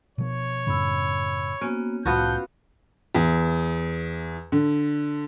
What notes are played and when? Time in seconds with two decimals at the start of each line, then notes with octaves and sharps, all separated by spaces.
0.18 B2 F3 C#5
0.67 F#2 A2 C#3 B5 E6
1.61 A#3 B3 C#4 F#4
2.06 C2 A2 B3 F4 F#4 A5 G6
3.15 E2
4.52 D3